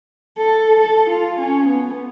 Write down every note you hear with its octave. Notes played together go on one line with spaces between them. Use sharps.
A4
A4
F4
C#4
B3